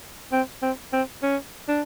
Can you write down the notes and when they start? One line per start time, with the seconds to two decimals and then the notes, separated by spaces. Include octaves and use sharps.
0.32 C4
0.62 C4
0.93 C4
1.23 C#4
1.69 D4